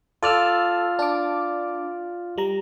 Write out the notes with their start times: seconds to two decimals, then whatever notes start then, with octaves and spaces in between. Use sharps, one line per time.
0.23 F4 A4 D5 E6 F6
0.99 D4 D6
2.38 G3 A#5